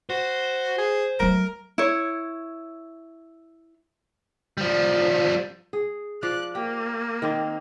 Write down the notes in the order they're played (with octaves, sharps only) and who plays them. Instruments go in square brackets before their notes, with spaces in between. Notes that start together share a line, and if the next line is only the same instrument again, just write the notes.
[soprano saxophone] F#4 [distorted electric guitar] C5
[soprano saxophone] G#4
[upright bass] F#3 A3 [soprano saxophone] A#4
[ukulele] E4 C#5
[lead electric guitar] F3 G3
[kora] G#4
[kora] F3 D5 F5 [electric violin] F#6
[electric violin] A#3 [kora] G4
[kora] D#3 C4